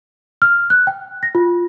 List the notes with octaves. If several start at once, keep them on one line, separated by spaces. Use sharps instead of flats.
F6
F#6
G5
A#6
F4